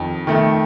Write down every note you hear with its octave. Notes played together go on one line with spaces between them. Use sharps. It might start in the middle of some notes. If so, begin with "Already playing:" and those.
Already playing: F2 D#3
D#3 A3